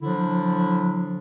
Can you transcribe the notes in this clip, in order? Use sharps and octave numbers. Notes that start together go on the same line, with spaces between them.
D3 F3 F#3 D4 E4